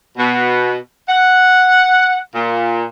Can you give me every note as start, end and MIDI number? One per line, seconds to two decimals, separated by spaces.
0.17 0.76 47
1.08 2.17 78
2.34 2.84 46